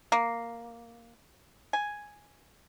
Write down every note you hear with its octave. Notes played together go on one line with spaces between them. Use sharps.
A#3
G#5